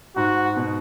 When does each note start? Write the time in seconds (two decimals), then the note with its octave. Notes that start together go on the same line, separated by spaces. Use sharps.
0.16 G#2 F#4
0.57 B2